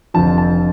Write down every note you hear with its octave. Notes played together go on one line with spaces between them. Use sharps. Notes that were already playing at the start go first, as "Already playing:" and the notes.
F1 F2 D3 F3 A5
A5